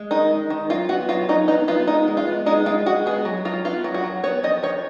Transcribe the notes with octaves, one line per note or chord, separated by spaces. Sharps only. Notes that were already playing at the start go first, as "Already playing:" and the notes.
Already playing: G#3
D#3 D#4
G#3
D#3
F#3 F4
B3 F#4
F#3 F4
F#3 D#4
B3 D#4
B3 F4
G#3 D#4
G#3
F4
B3
G#3 D#4
G#3 F4
G#3 F#4
B3 G#4
F#3
F#3 F4
B3 F4
F#3
F#4
F#3
B3 C#5
F3 D#5
F3 C#5